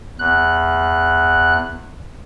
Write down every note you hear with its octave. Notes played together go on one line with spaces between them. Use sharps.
E2 F#6